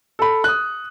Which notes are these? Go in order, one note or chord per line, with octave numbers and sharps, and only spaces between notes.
A4 B5
D#6 F#6